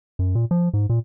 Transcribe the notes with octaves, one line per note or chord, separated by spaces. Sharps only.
F#2
A#2
F3
G#2
A#2